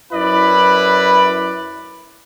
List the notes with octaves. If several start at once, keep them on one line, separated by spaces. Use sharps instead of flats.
F#2 E4 B4 D5 B5